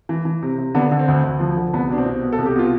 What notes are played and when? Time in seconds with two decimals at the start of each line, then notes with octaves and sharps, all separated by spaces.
0.09 E3
0.25 E3
0.43 C3
0.58 C3
0.74 D3 B3 D4
0.91 D3
0.99 C4
1.08 D2
1.23 D2
1.40 F3
1.57 D3
1.73 C2 B3
1.89 B2 D4
1.98 C4
2.05 C2
2.23 B2
2.32 A4
2.38 C2
2.46 G4
2.56 B2 F4